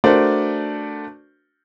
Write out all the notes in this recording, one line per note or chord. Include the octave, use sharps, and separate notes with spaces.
A3 D4 F#4 A#4 C5 D5